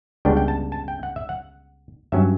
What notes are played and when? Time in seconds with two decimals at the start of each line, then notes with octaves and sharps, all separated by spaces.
0.25 C#2 C#3 G3 B3 D4 G5
0.37 G5
0.48 A5
0.72 A5
0.88 G5
1.03 F#5
1.16 E5
1.29 F#5
2.12 G2 F#3 C#4 E5